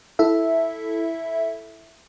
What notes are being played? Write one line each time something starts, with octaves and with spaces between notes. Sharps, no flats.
E4 A4 E5